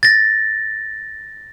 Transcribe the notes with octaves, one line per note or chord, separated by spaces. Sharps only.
A6 A#6